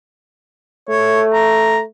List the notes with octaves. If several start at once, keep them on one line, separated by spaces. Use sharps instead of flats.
A3 C#5
A#5